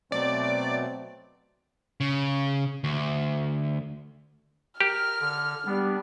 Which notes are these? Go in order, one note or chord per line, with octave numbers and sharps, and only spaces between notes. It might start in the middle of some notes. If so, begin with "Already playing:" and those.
B2 F#3 A3 C4 D5
C#3
D2
G4 A#4 F6
D3
G3 B3 D4